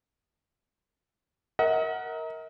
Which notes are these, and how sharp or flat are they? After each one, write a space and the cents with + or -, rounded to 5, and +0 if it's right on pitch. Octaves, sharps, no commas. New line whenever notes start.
A#4 +0 D#5 +45 F#5 +0